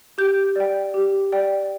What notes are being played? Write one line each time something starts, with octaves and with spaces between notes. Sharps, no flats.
G4 G6
D5 G5
G4
D5 G5